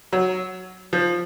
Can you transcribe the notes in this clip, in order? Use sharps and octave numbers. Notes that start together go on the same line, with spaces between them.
F#3
F3